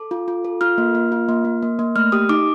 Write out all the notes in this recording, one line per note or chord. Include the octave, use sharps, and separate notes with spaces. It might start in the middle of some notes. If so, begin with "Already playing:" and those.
Already playing: A4 D6
F4
F4
A4
F4 F6
A#3
A#3
F4
A#3
A#3
A#3
A#3
A3 F6
G4 D#6
D#4 D6